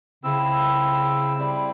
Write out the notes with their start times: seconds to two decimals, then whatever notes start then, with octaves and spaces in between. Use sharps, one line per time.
0.24 C#3 C4 E4 E6
1.39 G3 C4 E4